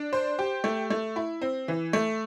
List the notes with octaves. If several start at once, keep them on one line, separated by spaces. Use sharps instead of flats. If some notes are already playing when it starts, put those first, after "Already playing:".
Already playing: D4
C5
G4
A3
A3
E4
C4
E3
A3